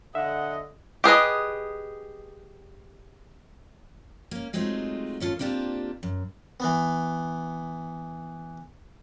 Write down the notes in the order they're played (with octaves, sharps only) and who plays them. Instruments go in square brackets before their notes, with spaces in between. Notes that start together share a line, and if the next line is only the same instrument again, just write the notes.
[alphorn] D3 [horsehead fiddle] D#5 [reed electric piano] E5 [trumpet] F#5
[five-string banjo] G4 G#4 B4 D#5
[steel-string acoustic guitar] A#3 C#4
F#3 G#3 A3 C4 D#4 F4
D#2 C#4 F4 A4
A#3 C4 D4 F4 G4
F#2
[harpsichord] E3 B3